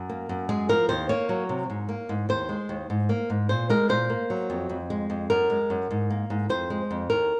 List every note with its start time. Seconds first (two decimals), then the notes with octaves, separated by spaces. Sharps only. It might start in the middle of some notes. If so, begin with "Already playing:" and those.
Already playing: F#2
0.09 A#3
0.29 F#2
0.49 G#3 G#4
0.69 F3 A#4
0.89 D#2 C5
1.09 A#3 C#5
1.29 F#3
1.49 C3
1.70 G#2
1.89 A#3
2.09 G#2
2.29 D#2 C5
2.49 G#3
2.69 D#2
2.90 G#2
3.09 A#3
3.30 G#2
3.49 A#2 C5
3.70 G#3 A#4
3.89 A#2 C5
4.10 A#3
4.30 F#3
4.50 F2
4.69 F2
4.90 G#3
5.10 F2
5.30 F#2 A#4
5.50 G#3
5.70 F#2
5.91 G#2
6.10 A#3
6.30 G#2
6.49 F2 C5
6.70 G#3
6.91 F2
7.10 D#2 A#4